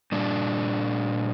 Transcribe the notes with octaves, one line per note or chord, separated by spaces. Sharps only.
A#2 G3 D4